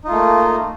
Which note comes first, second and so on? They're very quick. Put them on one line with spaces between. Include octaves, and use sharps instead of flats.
D#4 F4 A3 A#3